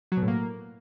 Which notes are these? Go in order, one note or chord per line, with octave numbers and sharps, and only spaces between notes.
F#3
B2
A2
A#3